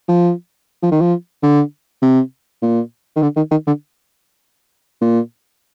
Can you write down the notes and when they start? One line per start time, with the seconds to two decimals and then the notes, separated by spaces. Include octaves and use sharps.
0.08 F3
0.83 F3
0.91 D#3
1.01 F3
1.43 D3
2.02 C3
2.62 A#2
3.16 D#3
3.22 D3
3.36 D#3
3.51 D#3
3.67 D3
5.02 A#2